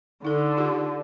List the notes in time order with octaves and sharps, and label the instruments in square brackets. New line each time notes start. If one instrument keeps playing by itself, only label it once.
[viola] D3 [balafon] D#4 A4
[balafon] D#4 F4 G4